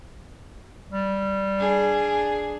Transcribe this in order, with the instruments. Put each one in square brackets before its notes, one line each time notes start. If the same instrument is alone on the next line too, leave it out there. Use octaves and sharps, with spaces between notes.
[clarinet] G3
[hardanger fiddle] D4 G#4